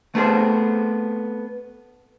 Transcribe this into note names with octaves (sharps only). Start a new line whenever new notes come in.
A3 B3 C4 G#4 C5